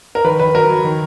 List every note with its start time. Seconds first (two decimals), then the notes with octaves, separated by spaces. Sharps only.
0.15 A#4
0.24 D#3 B4
0.40 D#3 B4
0.54 F#3 A#4
0.69 F#3
0.84 D#3